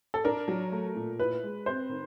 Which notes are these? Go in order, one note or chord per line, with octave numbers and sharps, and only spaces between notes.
A4
D4 A#4
F#3
A3
A#2
E4 B4
G#3
C4 C5
D#3